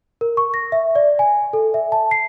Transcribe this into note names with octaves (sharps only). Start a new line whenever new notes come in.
A#4
C#6
A#6
E5
D5
G#5
A4
E5
A5
C7